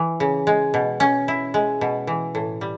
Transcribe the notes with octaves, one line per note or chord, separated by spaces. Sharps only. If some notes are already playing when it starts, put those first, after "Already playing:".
Already playing: E3
C#3
G#3
B2
C#4
E4
G#3
B2
E3
A2
G3